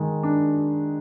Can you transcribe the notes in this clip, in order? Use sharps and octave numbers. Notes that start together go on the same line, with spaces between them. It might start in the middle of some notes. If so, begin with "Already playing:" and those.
Already playing: D#3 G#3
D4